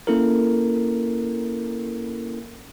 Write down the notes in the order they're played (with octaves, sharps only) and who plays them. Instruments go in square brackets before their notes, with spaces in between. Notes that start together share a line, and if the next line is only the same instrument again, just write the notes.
[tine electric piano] A#3 C#4 E4 A4 A#4